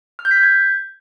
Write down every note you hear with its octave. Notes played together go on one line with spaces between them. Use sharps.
F6
G6
B6
G6
G#6